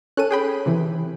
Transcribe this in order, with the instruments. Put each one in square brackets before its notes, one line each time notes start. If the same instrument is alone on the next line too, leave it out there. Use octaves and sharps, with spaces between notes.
[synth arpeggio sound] C#4 A4 [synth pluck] F#6 D#7
[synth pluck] G#4 G5 B5
C3 E3